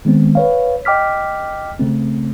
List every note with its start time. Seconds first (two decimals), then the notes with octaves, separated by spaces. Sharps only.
0.05 D#3 G#3 B3 C4
0.35 B4 C#5 F5
0.85 D#5 G5 D6 F6 B6
1.79 C#3 A3 C4